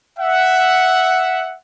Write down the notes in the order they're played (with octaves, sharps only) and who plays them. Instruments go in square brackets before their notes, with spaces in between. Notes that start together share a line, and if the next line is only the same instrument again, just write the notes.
[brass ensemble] E5 F#5